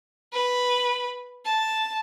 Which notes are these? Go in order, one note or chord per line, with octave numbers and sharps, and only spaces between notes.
B4
A5